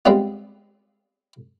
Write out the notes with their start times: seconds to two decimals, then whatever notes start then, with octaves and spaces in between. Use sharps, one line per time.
0.05 G3 G#3 B3 C4 D4 F4